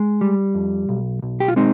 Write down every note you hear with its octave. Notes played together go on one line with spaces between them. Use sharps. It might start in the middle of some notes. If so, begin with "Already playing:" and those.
Already playing: G#3
G3
F2
B1
B1
G4
F4
G#3 C4 D#4